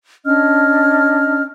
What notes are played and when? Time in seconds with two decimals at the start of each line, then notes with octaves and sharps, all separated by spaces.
0.25 C#4 D4 D#5 F6